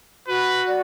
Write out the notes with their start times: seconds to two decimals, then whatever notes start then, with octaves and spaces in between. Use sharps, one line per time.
0.28 F#4 B4
0.67 D5